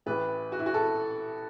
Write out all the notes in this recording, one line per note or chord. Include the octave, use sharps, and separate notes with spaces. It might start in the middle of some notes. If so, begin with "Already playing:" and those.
A1 A2 E3 B4
F#4
E4
F#4
A4